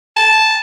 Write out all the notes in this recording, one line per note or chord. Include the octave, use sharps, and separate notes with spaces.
A5